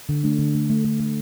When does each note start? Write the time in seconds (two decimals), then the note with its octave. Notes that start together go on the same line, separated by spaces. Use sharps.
0.09 D3
0.24 A3 D4
0.39 D3
0.55 A3
0.70 A3
0.84 A3
1.00 A3